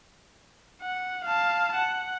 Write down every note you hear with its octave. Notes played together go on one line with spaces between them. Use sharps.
F#5
F5 A5
F#5